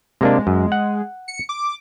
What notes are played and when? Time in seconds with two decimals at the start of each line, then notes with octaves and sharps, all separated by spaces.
0.21 C3 G#3 A#3 D4
0.47 F#2
0.72 F#5
1.28 C#7
1.49 D6